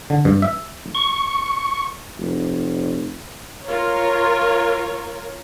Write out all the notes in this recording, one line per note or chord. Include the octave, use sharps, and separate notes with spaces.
D3
G2
E5
C#6
F1
F4 A#4 C#5